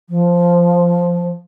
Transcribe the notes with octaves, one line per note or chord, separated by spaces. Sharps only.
F3